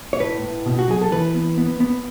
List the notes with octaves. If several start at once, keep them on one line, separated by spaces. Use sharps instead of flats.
C#5
A2 B4
A2
B2
F#4
F#3 G#4
A4
E3 B4
B3
B3
B3